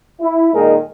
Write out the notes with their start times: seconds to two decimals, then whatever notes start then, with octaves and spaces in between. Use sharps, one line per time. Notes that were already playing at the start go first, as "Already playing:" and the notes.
0.22 E4
0.54 A#2 D#3 G#3 D#4 G#4 A#4